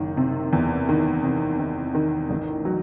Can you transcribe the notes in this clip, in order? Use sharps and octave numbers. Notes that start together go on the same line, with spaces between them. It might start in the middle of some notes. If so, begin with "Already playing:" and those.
Already playing: F#1 D#3
C3
E2
D#3
C3
D#3
D#3
A1
F#3